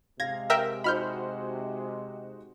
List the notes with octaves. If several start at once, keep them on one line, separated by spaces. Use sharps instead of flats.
C3 G#3 F5 G#6 A#6
A#4 E5 G5
D#4 F#4 C5 B5 F6 G6